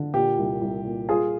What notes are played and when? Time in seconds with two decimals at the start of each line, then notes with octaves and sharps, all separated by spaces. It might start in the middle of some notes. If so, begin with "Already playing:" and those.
Already playing: D3
0.14 A#2 G4
0.38 C2
0.61 C2
0.85 A#2
1.09 G3 F4 G#4